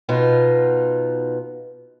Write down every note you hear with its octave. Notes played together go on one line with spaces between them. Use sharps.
B2 B3 D#4 F4